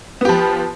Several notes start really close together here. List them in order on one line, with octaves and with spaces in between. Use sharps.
B3 G4 F3